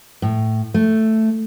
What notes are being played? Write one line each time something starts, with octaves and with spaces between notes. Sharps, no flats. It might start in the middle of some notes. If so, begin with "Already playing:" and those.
A2
A3